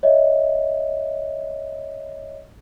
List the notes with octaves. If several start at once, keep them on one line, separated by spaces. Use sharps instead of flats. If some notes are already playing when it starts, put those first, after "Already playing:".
C#5 D#5 E5